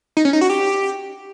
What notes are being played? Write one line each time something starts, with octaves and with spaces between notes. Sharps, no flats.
D#4
C#4
D#4
F#4
G4